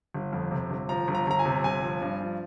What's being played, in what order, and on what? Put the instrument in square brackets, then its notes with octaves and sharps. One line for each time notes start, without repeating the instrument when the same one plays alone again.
[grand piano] G1
F2
C3
G1
F3 A#5
G1
A#5
G1 A#5
G#5
C3
G1 G#5
F3
G2
F3